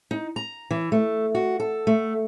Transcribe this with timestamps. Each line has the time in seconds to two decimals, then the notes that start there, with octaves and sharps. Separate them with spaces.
0.11 D#4
0.36 A#5
0.71 E3
0.92 A3
1.35 F#4
1.60 A4
1.87 A3